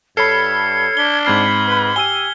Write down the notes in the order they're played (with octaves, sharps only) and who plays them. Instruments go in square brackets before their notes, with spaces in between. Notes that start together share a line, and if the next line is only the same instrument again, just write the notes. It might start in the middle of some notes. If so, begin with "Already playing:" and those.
[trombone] G2 [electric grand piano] A4 C#5 B5 [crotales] F6 C7 C#7 [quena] G#6
[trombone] D4 [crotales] B6 G7
[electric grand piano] G#2 C4 C7 [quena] B5 [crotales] F6 G#6
[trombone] B4
[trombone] G4 [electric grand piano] G#5 E6 D#7 [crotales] G7